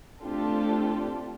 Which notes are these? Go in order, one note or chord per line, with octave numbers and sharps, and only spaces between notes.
A3 C4 D4 F4 G4 A4